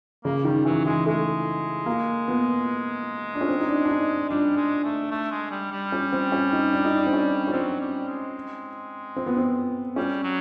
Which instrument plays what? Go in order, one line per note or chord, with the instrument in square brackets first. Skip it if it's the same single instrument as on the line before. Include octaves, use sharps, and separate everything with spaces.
[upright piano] C#3 [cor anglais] A#3
[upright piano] D#3 [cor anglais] G3
[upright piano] E3 [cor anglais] F#3
[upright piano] E3 [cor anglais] G#3
[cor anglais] G#3 [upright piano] A3
[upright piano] A#3
B3
D4
C#4
C4
D#4
D4
D4
D#4
[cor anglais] G3 [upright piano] D4
[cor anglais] G#3
A3
A3
G#3
G3
G3
[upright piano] C#4
C4
C#4
D#4
D4
D#4
D4
C4
C#4
C#4
[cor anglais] F#3 [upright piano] C4
[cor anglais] G3
G#3
[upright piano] C4
B3
C4
[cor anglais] G3 [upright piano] C#4
[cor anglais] F#3